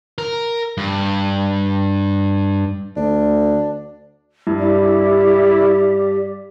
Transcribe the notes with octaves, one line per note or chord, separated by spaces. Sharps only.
A#4
G2
D2 D4
G2 E4
G4 D5